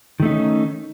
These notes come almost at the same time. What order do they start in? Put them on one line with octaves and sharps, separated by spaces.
D#3 A3 D#4 C#4